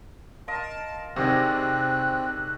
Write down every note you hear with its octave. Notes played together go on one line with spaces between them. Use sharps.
F4 A#4 D#5 A5
C3 D#3 C4 F#4 G#4 D5 F#6